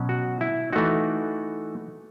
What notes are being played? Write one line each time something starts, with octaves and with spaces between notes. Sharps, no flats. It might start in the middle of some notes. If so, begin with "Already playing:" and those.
Already playing: B2 F#3 C#4
F#4
E4
E3 A3 D#4 F#4